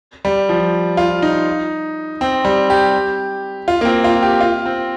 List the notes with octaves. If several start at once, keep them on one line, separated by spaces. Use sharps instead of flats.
G3
F3
F4
D#4
C4
G3
G4
F4
A#3
C4
F4
G4
F4
C4